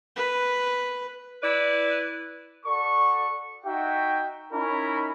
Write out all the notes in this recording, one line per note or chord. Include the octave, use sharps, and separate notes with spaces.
B4
E4 B4 D5
F#4 A4 D5 C#6
D#4 F#4 E5 G5
C#4 D#4 E4 A#4 B5